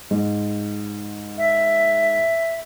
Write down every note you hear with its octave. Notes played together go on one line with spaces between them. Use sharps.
G#2
E5